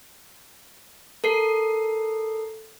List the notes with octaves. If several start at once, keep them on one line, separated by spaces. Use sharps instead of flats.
A4 A#4 C7